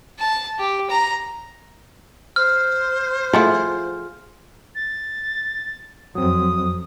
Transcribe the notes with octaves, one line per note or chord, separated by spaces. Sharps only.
A5
G4
A#5
C5 F6
F3 A3 E4 F4 G#4 F#5
A6
F2 F#3 C4 D#6